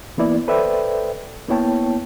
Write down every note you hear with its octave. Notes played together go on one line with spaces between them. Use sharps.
E3 A#3 B3 E4 D5
A4 B4 C5 D5 E5 G5
A#3 B3 E4 C#5 G5 A5